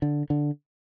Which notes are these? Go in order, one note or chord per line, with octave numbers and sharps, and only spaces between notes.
D3
D3